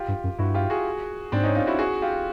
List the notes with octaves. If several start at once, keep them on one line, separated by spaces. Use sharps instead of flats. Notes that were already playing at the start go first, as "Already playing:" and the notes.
Already playing: F4 G4
G2
F#2
G2 E4 F#4
F4 G4
F#4 G#4
G#2 C4 D4
C#4 D#4
D#4 F4
E4 F#4
F#4 G#4
F4 G4